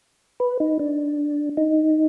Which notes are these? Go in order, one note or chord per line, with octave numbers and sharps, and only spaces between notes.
B4
D#4
D4
D#4